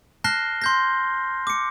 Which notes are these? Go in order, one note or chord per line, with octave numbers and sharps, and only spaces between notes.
A5 F6 F#6 A#6 C7 G7
C6 G6 A#6
D6 C#7